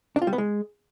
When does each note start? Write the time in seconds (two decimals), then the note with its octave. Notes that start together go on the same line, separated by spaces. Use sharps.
0.16 D4
0.22 F4
0.27 G3
0.33 B3
0.38 G#3